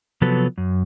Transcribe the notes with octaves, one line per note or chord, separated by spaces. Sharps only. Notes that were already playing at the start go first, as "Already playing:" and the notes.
C3 F3 F#3 B3 A4 B4
F#2